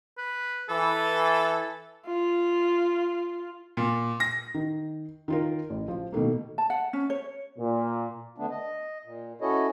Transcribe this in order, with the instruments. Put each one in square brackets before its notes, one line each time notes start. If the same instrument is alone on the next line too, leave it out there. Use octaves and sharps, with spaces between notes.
[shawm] B4
[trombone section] E3 [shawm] A4
[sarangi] F4
[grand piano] A#2
A#6
[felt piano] D#3
D#3 F4 A#4
A1
F3
B2 D#3 A3 A#3
[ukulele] A5
F#5
C#4
C#5
[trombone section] A#2
[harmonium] D3 A3 B3 D4
D#5
A#2
C#4 E4 F#4 A4 C#5 D#5